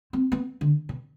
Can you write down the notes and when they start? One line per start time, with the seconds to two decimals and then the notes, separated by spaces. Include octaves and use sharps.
0.13 C4
0.32 B3
0.61 D3
0.89 B2